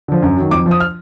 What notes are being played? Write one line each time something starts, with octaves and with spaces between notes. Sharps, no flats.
D3 F3
F#2
D#3 F#3
F2 D6
F3
D#6
F6